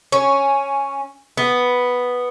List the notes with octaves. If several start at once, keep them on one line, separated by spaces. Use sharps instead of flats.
C#4
B3